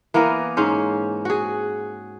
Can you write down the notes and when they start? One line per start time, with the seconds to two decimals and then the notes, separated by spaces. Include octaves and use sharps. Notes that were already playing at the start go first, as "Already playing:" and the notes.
0.14 E3 A#3 B3 A#4
0.57 G#2 C#4 C5
1.25 F#4 G#4